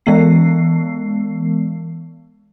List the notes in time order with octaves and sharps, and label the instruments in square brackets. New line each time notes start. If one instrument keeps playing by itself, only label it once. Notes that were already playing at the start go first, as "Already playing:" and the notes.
[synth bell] E3 G#3 B3 C7